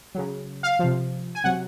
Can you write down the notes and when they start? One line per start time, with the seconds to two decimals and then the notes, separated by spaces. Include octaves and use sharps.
0.15 C#3 F#3
0.63 F5
0.79 C3 F3
1.35 G#5
1.44 C3 F#3 F#5